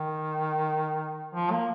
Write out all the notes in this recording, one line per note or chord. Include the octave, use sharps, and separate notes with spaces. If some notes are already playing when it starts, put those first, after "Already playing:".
Already playing: D#3
F3
A#3